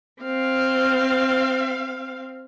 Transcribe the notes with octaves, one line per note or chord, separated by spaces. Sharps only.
C4 F5